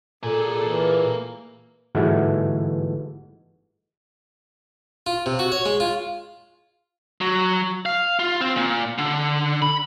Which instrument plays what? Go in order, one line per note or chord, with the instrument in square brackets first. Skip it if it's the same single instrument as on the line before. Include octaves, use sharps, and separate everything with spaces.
[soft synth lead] A#2 [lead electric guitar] A#3 G#5 [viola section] G#4 A4
[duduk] E3
[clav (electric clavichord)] G1 G#2 E3 G#3 A3 F#4
[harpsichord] F4
C3
F#4
C#5
G#3
F4
[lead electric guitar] F#3
F5
F4
C4
A#2
D3
B5